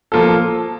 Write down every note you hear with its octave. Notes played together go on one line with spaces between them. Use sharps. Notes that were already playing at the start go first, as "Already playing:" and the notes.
F3 A#3 F4 A4